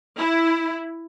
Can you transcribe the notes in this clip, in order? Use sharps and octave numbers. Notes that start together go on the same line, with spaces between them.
E4